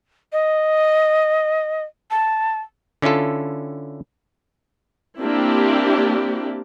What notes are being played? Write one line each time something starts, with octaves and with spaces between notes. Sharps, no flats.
D#5
A5
D3 C#4 E4 F4 A4
A#3 C4 D4 E4 G4